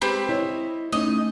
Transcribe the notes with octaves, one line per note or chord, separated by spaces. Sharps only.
G#3 C4 G4 B4 B5
E4 C#5 D#5
A3 C#4 D#4 D#5